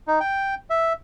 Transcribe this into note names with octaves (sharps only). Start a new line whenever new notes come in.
D#4
G5
E5